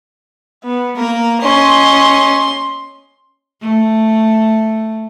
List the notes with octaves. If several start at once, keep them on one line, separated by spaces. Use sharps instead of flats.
B3
A#3 A#4
C#4 D#5 C6
A3